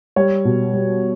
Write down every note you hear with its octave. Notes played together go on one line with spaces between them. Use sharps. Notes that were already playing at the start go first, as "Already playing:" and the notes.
G3 C#5
B2
G3